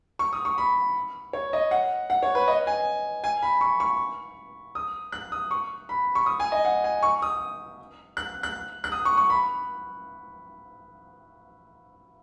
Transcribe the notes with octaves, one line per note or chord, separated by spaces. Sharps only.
C#6
D#6
C#6
B5
C#5
D#5
F#5
F#5
C#5
B4
D#5
G#5
G#5
B5
C#6
C#6
D#6
F#6
D#6
C#6
B5
C#6
D#6
G#5
D#5
F#5
G#5
C#6
D#6
F#6
F#6
F#6
D#6
C#6
C#6
B5